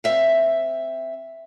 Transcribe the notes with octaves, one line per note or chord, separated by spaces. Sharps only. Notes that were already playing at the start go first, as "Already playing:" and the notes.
C4 E5 F5